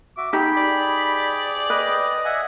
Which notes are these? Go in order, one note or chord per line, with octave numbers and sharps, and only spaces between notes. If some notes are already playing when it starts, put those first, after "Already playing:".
F#4 E5 D6
D#4 G4 G#4 G5 B5
D5
B4 D#5
E5 F#5 G#5